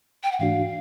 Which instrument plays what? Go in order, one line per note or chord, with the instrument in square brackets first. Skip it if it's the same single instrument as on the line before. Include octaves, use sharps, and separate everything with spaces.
[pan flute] G5
F#5
[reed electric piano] G#2 E3 A3 D4 F#4 [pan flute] F5